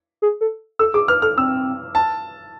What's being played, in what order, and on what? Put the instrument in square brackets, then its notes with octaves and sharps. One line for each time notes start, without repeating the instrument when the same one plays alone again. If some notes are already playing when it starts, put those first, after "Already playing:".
[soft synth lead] G#4
A4
[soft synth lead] A4 [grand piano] E6
[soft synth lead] G#4 [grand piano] D6
[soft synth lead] B4 [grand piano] F6
[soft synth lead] A4 [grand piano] F6
[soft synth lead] C4 [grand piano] E6
[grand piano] A5